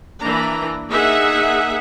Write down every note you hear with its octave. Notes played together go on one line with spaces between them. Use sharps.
E3 A#3 D4 A#5
A#3 D#4 G#4 E5 F#5